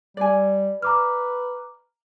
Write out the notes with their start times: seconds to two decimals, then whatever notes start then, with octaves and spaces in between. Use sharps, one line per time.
0.17 G3 D5 G#5
0.82 B4 A#5 D6 F6